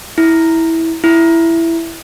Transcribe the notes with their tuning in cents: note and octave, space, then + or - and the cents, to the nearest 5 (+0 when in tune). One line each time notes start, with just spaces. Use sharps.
E4 -10
E4 +10